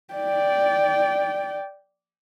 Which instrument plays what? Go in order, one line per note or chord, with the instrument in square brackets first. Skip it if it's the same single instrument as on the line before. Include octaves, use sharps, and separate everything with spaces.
[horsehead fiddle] D5 G5